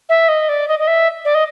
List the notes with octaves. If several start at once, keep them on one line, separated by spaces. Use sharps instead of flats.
E5
D#5
D5
D#5
D#5
E5
D5
D#5